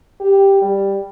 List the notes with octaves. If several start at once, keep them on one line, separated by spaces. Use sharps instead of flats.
G4
G3